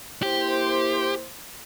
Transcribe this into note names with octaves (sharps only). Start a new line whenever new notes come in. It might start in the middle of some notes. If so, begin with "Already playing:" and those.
A#3 E4 G4 C5